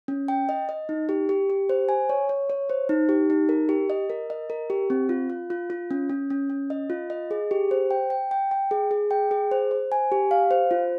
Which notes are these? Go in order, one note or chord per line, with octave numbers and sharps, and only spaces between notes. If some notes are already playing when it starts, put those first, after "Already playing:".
C#4
G5
D#5
D#5
D#4
G4
G4
G4
C5
G#5
C#5
C#5
C#5
C5
D#4
G4
D#4
A#4
G4
D#5
A#4
D#5
A#4
G4
C4
F4
F4
F4
F4
C#4
C#4
C#4
C#4
D#5
F4
D#5
G#4
G4
C5
G5
G5
G5
G5
G#4
G#4
G5
G#4
C5
C5
G#5
G4
F5
C5
F4